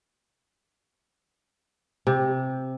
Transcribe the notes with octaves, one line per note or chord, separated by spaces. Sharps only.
C3